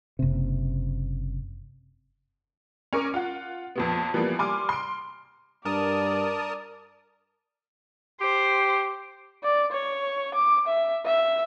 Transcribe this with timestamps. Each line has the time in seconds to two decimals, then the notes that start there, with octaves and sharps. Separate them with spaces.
0.19 F#1 C3
2.93 C#4 A#4 C#6 D6
3.14 F4 F#5
3.76 F2 A#2 B3
4.14 E3 F3 G3 A#3 B3
4.38 G3 G#5 C6 D6 F6
4.69 C6 D7
5.65 G2 A#4 D5 A5 D#6
8.21 G4 C5
9.44 D5
9.72 C#5
10.34 D6
10.67 E5
11.06 E5